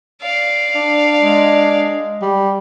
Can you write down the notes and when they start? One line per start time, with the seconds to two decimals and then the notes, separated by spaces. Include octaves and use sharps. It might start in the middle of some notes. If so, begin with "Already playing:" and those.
0.22 D5 F5
0.75 D4
1.22 G#3
2.22 G3